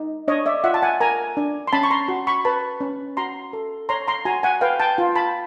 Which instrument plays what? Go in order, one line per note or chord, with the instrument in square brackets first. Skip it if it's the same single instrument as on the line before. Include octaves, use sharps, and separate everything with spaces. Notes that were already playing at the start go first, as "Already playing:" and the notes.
Already playing: [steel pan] D#4
D4 C#5 D#5
D5 E5
F4 E5 F#5
A5
F#5 G#5
A#4 G#5 A#5
D4
C6
C#4 A5 B5
C#6
A#5 C6
F#4
B5 C#6
B4 A5 B5
C#4
F#4 A#5 C6
A4
C#5 A#5 C6
A#5 C6
F#4 G#5 A#5
F#5 G#5
B4 F5 G5
G5 A5
F4
A5 B5